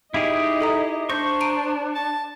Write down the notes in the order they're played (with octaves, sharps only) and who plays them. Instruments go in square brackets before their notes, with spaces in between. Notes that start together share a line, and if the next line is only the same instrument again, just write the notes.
[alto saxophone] D#4 [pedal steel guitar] E4 G4 G#4 [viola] D#5
[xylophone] A4 E5 A#5
[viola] D4 [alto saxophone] C5 [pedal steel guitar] C#6 [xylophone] G6 A#6
[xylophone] A#5 D7 D#7
[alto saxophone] A5